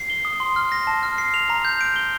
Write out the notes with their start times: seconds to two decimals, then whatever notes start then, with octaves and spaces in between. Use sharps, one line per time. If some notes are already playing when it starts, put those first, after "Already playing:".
Already playing: C7
0.10 G7
0.25 D#6
0.40 C6
0.56 F6
0.72 A#6
0.87 A5
1.03 F6
1.18 C7
1.34 F7
1.50 A#5
1.65 G6
1.81 D7
1.96 G7